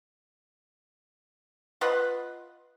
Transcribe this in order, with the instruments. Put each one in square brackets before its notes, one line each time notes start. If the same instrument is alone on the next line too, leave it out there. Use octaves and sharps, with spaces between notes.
[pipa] F4 B4 D#5 F#5